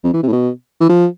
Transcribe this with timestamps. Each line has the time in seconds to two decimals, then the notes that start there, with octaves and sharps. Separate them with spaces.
0.04 F2
0.14 E3
0.23 C3
0.28 A2
0.32 B2
0.81 E3
0.89 F3